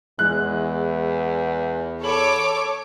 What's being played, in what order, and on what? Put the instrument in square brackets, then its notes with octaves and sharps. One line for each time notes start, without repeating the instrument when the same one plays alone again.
[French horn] E2 [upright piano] G#3 E4 F#6
[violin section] A4 C#5 D6 [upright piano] B5 F#7